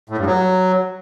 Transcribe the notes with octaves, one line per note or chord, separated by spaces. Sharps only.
A2
G2
F#3